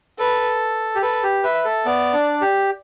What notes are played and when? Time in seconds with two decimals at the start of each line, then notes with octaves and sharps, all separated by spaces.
0.19 A4 B4
0.95 G4
1.02 A4 B4
1.23 G4
1.44 B4 E5
1.65 A4
1.86 B3 D5
2.14 D4
2.41 G4